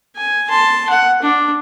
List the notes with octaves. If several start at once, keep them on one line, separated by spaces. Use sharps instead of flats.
G#5
A5 C6
F#5
D4